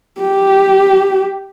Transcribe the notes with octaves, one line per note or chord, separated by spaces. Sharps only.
G4